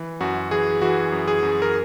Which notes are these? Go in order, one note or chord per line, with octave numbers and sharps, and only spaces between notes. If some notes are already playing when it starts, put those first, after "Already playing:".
Already playing: E3
F#2 F#4
E3 G#4
E3 F#4
F#2
G#4
F#2
A#4